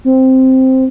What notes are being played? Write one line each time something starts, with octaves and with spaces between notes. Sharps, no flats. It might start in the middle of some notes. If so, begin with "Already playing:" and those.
C4